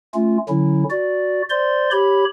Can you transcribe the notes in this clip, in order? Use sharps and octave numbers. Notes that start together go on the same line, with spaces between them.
A3 C#4 F4
D3 F#3 C#4 E4
F#4 D5
C5 D5 C6
G4 C#5 B5